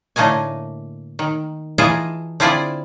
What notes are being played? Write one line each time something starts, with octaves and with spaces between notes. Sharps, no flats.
A2 D3 A3 A#3 D#5 G#5
D#3
E3 F4 G#4 D#5 A5 A#5
D3 C4 E4 F4 G#4 D5